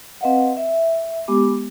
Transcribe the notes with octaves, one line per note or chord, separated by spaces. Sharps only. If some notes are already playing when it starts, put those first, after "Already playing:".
C4 B4 D#5 F5 F#5
E5
G#3 B3 G4 D6